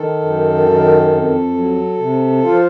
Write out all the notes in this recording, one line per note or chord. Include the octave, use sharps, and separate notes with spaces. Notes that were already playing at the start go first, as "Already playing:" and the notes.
Already playing: D#3 A4
F#2
D#3
F2
F#3
C3
F3 F4